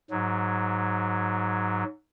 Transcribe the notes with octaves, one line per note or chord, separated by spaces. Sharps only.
G#2 F#3